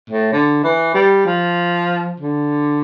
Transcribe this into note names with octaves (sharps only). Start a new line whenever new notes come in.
A2
D3
E3
G3
F3
D3